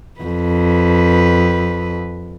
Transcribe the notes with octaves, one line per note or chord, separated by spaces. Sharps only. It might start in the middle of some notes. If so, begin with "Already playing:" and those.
F2 B4